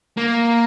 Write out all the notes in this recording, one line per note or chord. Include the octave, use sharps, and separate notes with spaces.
A#3